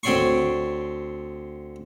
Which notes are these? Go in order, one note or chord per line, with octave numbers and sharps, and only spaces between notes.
D2 C4 C#5 D5 C6 C#6